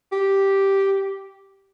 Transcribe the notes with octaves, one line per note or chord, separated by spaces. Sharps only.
G4